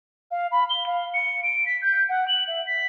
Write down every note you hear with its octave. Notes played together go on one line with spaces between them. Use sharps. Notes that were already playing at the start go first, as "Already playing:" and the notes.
F5
B5
G7
F5
C#7
D7
B6
G6
F#5
F#7
E5
B6